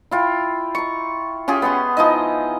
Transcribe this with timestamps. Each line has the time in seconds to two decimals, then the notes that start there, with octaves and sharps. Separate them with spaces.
0.11 E4 F4 G5
0.75 A#5 C#6
1.48 C#4 F4 G4 G#4
1.62 B3 F#5 C6
1.97 F3 D#4 E4 D#5